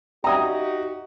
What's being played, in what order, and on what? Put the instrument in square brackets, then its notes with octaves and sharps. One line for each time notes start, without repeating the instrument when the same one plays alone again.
[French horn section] D#4 F#4 G4 [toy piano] D5 E5 G5 [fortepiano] A#5 D#6